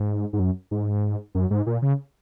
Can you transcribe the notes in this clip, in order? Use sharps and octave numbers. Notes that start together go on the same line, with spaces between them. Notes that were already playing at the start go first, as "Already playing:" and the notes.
Already playing: G#2
G#2
F#2
G#2
F#2
G#2
A#2
C#3